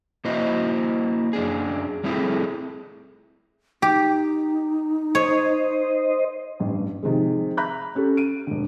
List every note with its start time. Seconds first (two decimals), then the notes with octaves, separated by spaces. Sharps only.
0.25 A#3 E4 F#4 C5 D#5
1.33 F#2 D4 G#4
2.04 G3 A3 C4 E4 G#4
3.82 D#4 G4
5.15 C5 C#5 D#5
6.60 A1 G2
7.03 C3 D#3 F3 G#3
7.57 E5 A#5 B5 F#6 G6
7.95 C#4 G4 A4
8.17 D7 D#7
8.47 E1 D3